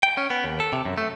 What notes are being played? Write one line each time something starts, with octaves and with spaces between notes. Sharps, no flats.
G5
C#4
B3
D#2
A4
C3
F#2
A3